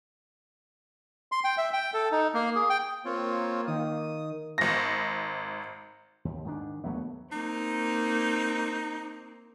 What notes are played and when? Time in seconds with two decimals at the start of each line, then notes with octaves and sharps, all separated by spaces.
1.32 C6
1.44 G5
1.58 E5
1.73 G5
1.94 A4
2.11 D#4
2.34 A#3
2.55 G#4
2.70 G5
3.05 A#3 C4 F4 C#5
3.67 D#3 D#6
4.58 G#1 A#6
6.25 D#2
6.45 G#2 D#3 D4
6.84 D#2 F#3 A3 B3
7.32 A#3 C4 D#4